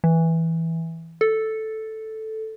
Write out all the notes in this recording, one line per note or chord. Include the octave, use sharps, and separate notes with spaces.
E3
A4